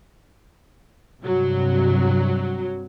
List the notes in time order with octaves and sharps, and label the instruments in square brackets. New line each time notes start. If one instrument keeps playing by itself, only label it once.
[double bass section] G2 C3 [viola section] F#3